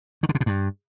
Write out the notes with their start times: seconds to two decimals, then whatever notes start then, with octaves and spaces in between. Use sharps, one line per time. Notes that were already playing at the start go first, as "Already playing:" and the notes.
0.23 D#3
0.29 D3
0.35 C3
0.41 B2
0.46 G2